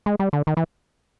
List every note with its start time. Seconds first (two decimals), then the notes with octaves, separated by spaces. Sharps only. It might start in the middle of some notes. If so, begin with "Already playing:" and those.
0.06 G#3
0.20 G3
0.33 D3
0.47 D#3
0.57 E3